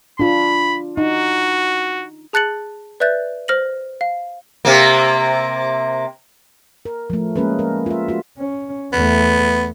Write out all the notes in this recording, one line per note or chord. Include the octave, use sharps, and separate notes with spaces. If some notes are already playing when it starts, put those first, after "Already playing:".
D4 F4 B5
D#4 F#4
G#4 A5 F#6 A6 C#7 F#7
B4 D5 E5 F#6 G6 A6
C5 F6 A#6 F#7
F5
C3 A#3
A#4
F3 A3
G#3 A#3 C#4 G#4 A#4 B4
A#4
F4 E5
F4 F#4
C#4
E2 A3 B3